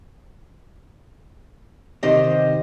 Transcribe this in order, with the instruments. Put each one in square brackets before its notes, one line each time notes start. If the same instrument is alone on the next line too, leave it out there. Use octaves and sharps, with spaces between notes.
[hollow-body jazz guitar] C3 D#3 [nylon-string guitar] G4 C5 D#5